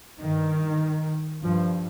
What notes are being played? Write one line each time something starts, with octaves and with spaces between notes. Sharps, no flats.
G2 D#3
G2 F3